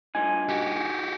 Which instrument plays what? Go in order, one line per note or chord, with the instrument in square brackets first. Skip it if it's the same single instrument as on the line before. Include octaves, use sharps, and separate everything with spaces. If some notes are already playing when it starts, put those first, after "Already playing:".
[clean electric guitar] G2 A#2 D#4 [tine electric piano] G#5
[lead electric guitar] F#4 G4